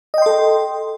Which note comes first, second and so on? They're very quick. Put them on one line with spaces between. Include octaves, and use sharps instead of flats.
D#5 G5 C6 A4